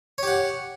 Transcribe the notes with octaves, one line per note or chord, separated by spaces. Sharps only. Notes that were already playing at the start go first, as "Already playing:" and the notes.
G4 C#5 F#5